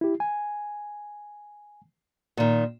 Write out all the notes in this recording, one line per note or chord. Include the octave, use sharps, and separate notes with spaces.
E4 G4
G#5
A#2 D#3